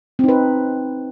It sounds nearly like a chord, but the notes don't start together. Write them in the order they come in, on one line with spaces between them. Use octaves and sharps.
C4 D#4 B4